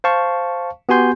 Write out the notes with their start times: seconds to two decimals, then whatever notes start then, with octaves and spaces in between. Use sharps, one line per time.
0.04 C5 F5 A5 C#6
0.89 B3 F#4 G4 G#5 C6 G6